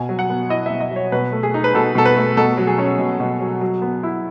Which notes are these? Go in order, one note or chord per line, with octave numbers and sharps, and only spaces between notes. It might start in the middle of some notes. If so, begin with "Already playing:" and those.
Already playing: B2 G#5
F#3
F#5
B3
E4 D#5
B2 E5
D#5
F#3
C#5
B2 B4
A3
G#4
D#4
B4
B2 A4
B2 A4
B4
A3
B2 A4
F#3
G#4
C#4
B2
B2
F#3
F#3
B3
E4